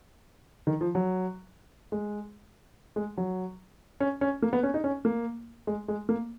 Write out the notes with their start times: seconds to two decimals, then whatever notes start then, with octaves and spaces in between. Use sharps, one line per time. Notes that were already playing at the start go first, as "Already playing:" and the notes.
0.67 D#3
0.81 F3
0.95 F#3
1.92 G#3
2.96 G#3
3.17 F#3
4.00 C#4
4.21 C#4
4.42 A#3
4.53 B3
4.63 C#4
4.74 D#4
4.84 C#4
5.05 A#3
5.67 G#3
5.88 G#3
6.09 A#3